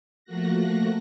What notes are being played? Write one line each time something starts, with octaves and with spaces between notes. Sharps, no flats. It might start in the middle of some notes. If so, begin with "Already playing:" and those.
F3 A3 A#3 F#4 F#6 A#6